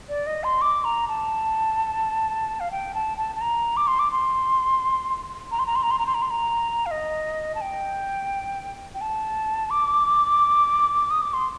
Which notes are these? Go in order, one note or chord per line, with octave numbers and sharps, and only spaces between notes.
D5
D#5
C6
D6
A#5
A5
F5
G5
A5
A5
A5
A#5
D6
C6
D6
C6
A#5
C6
A#5
C6
A#5
C6
A#5
C6
A#5
C6
A#5
F5
D#5
A5
G5
G5
A5
D6
D#6
D6
C6